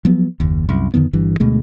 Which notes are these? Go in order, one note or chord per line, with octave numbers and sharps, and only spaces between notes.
F3 F#3 B3
F#1 D#2
C2 F#2
F2 D3 D#3 B3
G1 G2 E3
D2 B2 G#3 A3